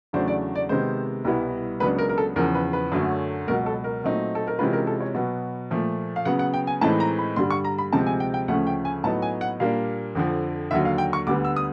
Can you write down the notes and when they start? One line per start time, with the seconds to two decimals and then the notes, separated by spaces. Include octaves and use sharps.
0.13 E2 C#3 F#3 A3 D4 C5
0.28 D5
0.55 D5
0.69 C3 D#3 G#3 B3 C5
1.25 C2 B2 G3 B3 E4
1.80 C#2 C#3 F#3 B3 D4 B4
1.98 A#4
2.09 A#4
2.18 A4
2.36 E2 C#3 F3 A#4
2.55 B4
2.73 B4
2.92 F#2 D3 F#3 A3 C#4
3.47 C#2 B2 F#3 A#4
3.66 A4
3.84 A#4
4.04 A#2 F#3 A3 C4 D#4
4.35 A4
4.47 A#4
4.59 C3 E3 G#3 C#4 F4 B4
4.73 A#4
4.87 A4
5.00 C#5
5.14 B2 F#3 B3
5.71 A#2 F3 A3
6.16 F5
6.25 C#3 F#3 B3 F#5
6.39 F#5
6.54 G5
6.67 G#5
6.81 A2 E3 G#3 C4 D#4 A5
7.00 A#5
7.19 B5
7.36 G2 D3 G3 C6
7.51 C#6
7.65 A#5
7.78 B5
7.92 D2 C3 F3 G#3 C4 A5
8.06 G#5
8.20 G5
8.34 G5
8.48 D2 C#3 F3 A3 C#4 F#5
8.67 G5
8.85 G#5
9.04 A2 F#3 B3 D#4 A5
9.22 G#5
9.41 F#5
9.60 A#2 G3 A#3 D4 F5
10.15 F2 D3 F3
10.71 D#2 D3 F#3 E5
10.85 F5
10.98 G5
11.13 C#6
11.27 D2 D3 G3 B3 D6
11.45 E6
11.56 D#6